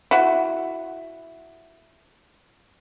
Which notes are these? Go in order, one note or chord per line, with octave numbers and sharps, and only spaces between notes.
E4 F#4